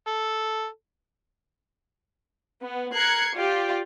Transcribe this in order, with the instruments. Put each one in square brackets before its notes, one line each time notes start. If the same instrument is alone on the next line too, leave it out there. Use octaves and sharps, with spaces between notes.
[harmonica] A4
[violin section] B3
A#4 F#6 G#6 C7 C#7
F4 G4 D5